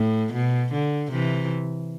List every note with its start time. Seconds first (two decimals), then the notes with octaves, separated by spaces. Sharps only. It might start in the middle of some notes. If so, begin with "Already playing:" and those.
Already playing: A2
0.34 B2
0.73 D3
1.12 C3 E3